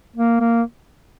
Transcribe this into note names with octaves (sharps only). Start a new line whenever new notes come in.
A#3
A#3